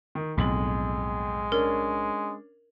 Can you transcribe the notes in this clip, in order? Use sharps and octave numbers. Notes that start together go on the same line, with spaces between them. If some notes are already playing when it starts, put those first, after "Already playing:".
D#3
B1 F2 A2 G#3 F#7
C#4 D4 A#4